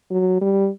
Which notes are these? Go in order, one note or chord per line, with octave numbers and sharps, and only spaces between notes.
F#3
G3